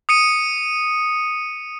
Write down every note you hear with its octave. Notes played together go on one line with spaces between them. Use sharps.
D#6 C#7 D#7